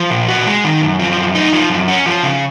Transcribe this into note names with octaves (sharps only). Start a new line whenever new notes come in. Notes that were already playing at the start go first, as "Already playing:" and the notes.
Already playing: F3
A#2
F#4
G#3
D#3
F#2
F3
F#2
D#4
F3
F#2
C#4
F3
C#3